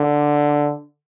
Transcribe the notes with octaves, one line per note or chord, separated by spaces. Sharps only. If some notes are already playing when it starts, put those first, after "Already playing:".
Already playing: D3